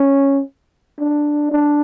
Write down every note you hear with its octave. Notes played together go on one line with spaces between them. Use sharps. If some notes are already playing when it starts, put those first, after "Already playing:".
Already playing: C#4
D4
D4